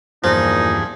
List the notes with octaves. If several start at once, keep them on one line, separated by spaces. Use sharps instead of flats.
E2 G2 A#2 F3 D#4 G#4